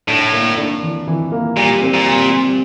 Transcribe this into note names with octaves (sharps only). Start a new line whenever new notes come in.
A2 D4
A#3
D4
E3
E3
A#3
A#2 G3
C4
A#2
G3
G3